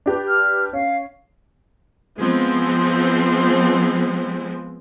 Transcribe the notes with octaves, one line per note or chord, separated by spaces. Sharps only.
D4 G4 B4
F6
C#4 F5
F3 G#3 B3 C4